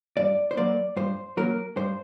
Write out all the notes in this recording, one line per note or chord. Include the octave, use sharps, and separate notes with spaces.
G2 D5
C5
F#3 A#3 D5
G2 C5
F#3 A#3 A#4
G2 C5